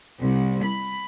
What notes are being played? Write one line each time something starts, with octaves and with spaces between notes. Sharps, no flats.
C2
B5